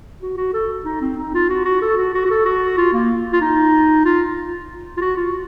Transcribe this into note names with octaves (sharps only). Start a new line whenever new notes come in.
F#4
F#4
A4
D#4
C4
D#4
F4
F#4
F#4
A4
F#4
F#4
F#4
A4
F#4
F4
A#3
F4
D#4
F4
F4
F#4
F4